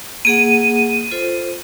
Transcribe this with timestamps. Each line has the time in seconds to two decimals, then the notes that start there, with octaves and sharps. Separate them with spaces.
0.25 A#3 G#4 F#5 D#7
1.11 F4 A4 C5